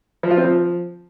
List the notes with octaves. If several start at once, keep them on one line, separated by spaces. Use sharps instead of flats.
F3
F4
C4
F3